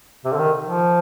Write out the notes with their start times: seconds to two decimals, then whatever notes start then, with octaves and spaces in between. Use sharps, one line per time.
0.25 C3
0.33 D3
0.38 D#3
0.64 F3